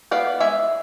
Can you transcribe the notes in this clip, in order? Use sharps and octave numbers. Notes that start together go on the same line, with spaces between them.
B3 D5 F5
G#3 E5 G#5